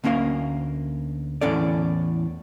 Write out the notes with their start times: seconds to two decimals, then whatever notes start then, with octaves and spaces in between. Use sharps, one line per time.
0.04 D2 A#3 C#4 A#4 F5
1.41 E2 A2 C#4 A4 D5